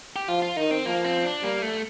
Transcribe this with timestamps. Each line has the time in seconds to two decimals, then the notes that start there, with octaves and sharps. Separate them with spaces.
0.16 G4
0.28 F3 F4
0.42 F4
0.56 D#3 D#4
0.71 C4
0.86 F3 A#3
1.04 C4
1.24 D4
1.43 G3 A#3
1.62 A3